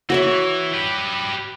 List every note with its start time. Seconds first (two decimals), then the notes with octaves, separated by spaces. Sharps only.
0.10 E3 F#4 C#5 E5
0.74 G4 B4